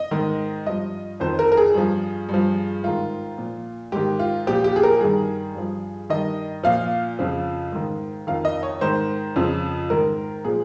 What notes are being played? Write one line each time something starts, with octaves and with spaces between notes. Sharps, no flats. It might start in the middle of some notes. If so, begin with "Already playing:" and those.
Already playing: D#5
G#2 D#3
G2 F3 D#5
F2 D#3 C5
A#4
A#4
G#4
G2 F3
G2
F3
G#2 D#3 F4
A#2 F3
G#2 D#3 G4
F4
A#2 F3 G4
G4
G#4
A#4
G2 D#3 G#4
G2 F3
G2 D#3 D#5
A#2 F3 F5
F2 C#3 F3
G#2 D#3
F2 D#3 F5
D#5
C#5
G#2 D#3 C5
F2 C#3 F3
G#2 D#3 A#4
A#2 F3 G#4